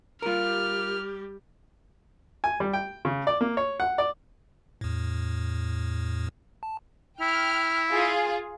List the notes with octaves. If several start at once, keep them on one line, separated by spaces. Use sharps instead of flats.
G3 F4 G4 A#4 F6
G#5
G3
G5
C#3
D5
A#3
C#5
F#5
D5
E2 A2
A5
E4 G5 F6
F4 G#4